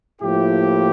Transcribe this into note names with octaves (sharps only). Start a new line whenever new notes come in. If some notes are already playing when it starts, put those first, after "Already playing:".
A2 F3 A#3 E4 G4